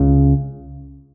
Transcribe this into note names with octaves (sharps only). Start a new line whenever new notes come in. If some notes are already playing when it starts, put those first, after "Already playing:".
Already playing: C#2 C#3